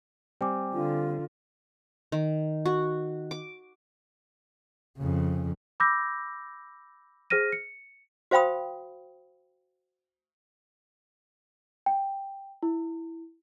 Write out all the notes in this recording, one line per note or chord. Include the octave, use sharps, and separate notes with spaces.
G3 C4 G5 G#5 D6
D3 F4
D#3
F#4
D6
F2 C#3
B5 D6 E6 G6 A#6
G#4 C5 F6 A#6 D#7
C#7
F#4 C5 F5 G5 B5 D#6
G5
E4